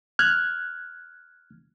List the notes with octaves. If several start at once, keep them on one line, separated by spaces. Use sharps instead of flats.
F6 F#6 G#6